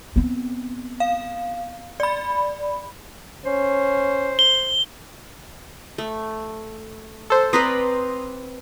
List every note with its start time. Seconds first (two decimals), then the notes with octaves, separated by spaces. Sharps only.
0.16 B3 C4
1.00 F5
2.00 D5 B5
3.45 C#4 C5
4.39 G7
5.98 A3
7.30 A4 C5
7.53 C4 B4 D5 A#5 C6 D#6